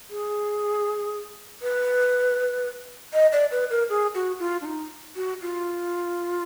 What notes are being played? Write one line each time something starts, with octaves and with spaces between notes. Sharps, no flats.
G#4
B4
D#5
D5
B4
A#4
G#4
F#4
F4
D4
D#4
F#4
F4